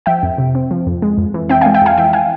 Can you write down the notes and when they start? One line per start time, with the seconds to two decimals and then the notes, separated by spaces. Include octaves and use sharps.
0.06 F3 E5 G5
0.23 F2
0.38 C3
0.55 C4
0.71 F3
0.87 F2
1.02 G#3
1.18 F2
1.34 E3
1.49 C4 E5 G5
1.61 G#3 F5 G#5
1.74 E5 G5
1.81 F2 F5 G#5
1.98 E3 E5 G5
2.13 F5 G#5